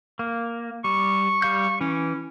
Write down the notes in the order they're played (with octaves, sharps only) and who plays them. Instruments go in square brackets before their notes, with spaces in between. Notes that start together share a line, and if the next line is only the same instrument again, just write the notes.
[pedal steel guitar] A#3
[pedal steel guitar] G3 [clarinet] C#6
[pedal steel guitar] G3 F5 G6
[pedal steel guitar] E3 [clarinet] C#4